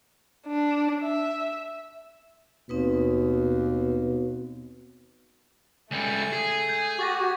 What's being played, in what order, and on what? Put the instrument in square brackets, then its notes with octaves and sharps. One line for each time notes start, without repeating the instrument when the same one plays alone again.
[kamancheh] D4
E5
[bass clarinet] D#2 [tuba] B2 [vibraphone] C4 D#4 B4
[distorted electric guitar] C#2 G3 [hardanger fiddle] A3 G#5
[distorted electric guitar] G#4
[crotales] G6 G#6
[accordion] F#4 G4 [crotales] C#6 A6 A#6